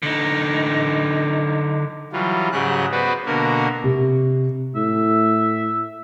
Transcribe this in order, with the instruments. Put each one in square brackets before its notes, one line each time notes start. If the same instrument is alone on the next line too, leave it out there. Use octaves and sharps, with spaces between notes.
[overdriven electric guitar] D3 D#4
[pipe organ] E3 F#3 G3 F4
G#2 C#3 F#3 G4 G#4 F#6
B3 F#4 B4 C5 D5
B2 D3 A#3 F#4 A#4
[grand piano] C3
[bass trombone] A2 [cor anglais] E5